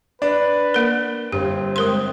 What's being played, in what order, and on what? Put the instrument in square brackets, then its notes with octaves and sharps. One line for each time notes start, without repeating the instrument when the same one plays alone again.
[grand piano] D4 [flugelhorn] B4
[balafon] A#3 A#4
[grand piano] G1 [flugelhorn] C4 [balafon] G4
[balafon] G#3 A#4 C6